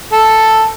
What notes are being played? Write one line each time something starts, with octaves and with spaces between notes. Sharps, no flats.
A4